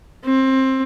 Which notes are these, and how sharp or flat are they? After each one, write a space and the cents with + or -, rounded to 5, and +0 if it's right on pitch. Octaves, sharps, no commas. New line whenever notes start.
C4 +20